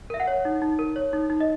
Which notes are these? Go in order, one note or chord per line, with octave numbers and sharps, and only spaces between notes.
A#4 E5
F#5
C#5
D#4
D#4
A#4
C#5
D#4
D#4
D#5